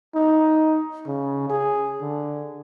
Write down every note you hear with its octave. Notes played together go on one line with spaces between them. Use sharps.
D#4
C#3
G#4
D3